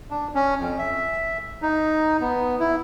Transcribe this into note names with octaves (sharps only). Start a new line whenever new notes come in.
D4
C#4
F2
E5
D#4
B3
E4